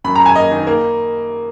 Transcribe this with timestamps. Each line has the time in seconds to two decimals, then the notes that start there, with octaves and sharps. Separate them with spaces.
0.04 F#2 B5
0.16 A#5
0.21 F#2
0.26 G#5
0.36 A#3 D#5
0.51 D#3
0.67 A#3